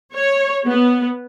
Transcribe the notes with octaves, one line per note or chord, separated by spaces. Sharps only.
C#5
B3